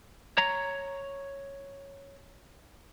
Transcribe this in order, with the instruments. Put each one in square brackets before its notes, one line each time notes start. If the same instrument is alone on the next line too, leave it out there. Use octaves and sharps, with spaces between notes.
[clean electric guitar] C#5 A#5